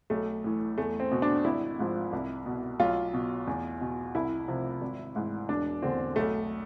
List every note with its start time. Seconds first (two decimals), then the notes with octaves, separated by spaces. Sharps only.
0.10 B1 A3
0.44 A2 E3
0.78 E2 A3
1.00 C4
1.12 B2
1.22 D4
1.45 G#1 E4
1.79 G#2 F3
2.13 C2
2.46 B2
2.80 B1 F4
3.14 B2
3.47 E2
3.81 B2
4.15 C2 E4
4.48 C3 F3
4.81 G#1
5.16 G#2 E3
5.49 E1 D4
5.82 E2 D3 C4
6.16 B1 A3